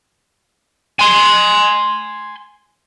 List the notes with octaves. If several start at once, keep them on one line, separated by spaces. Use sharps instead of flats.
G#5 C6